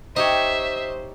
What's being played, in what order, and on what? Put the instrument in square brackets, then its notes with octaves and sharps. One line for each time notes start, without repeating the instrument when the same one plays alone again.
[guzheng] D#4 G4 C#5 [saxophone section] C5 [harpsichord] D#5 [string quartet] E5